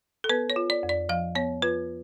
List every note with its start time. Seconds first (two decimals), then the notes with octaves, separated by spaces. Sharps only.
0.24 A4
0.30 B3 B4
0.50 C#5
0.56 F4
0.70 D5
0.83 F2
0.89 D5
1.09 F3 F5
1.35 B3 C#5
1.62 F4 B4